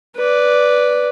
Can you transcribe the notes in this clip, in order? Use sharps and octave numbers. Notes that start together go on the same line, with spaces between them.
B4 D5